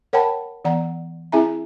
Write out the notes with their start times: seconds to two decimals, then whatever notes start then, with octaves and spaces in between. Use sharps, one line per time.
0.13 A#4 C#5 F#5 G5 A5 B5
0.65 E3 B3 D5 F#5 A#5
1.32 C4 E4 G#4 E5 G#5 A#5